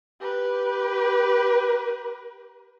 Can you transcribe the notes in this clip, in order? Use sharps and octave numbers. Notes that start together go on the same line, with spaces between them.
G4 B4